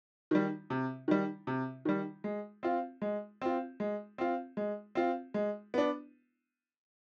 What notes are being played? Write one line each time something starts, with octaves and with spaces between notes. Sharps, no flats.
D#3 G3
C3
D#3 G3
C3
D#3 G3
G#3
C4 F4
G#3
C4 F4
G#3
C4 F4
G#3
C4 F4
G#3
B3 D4